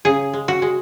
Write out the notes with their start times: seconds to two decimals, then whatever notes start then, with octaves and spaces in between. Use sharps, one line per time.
0.05 C#3 G#4
0.33 G#3
0.48 F#4
0.62 G#3